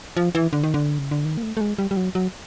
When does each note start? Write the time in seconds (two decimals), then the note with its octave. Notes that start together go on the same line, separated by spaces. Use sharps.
0.17 F3
0.35 E3
0.53 D3
0.64 D#3
0.74 D3
0.99 C#3
1.11 D3
1.25 D#3
1.37 A#3
1.43 A3
1.57 A3
1.61 G#3
1.79 G3
1.91 G3
1.97 F#3
2.15 F#3